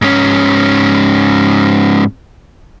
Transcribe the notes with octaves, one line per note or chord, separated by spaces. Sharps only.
G#2 C#4